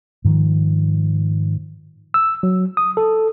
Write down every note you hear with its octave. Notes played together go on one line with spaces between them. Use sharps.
G#2 D#3 F3
E6
F#3
D#6
A4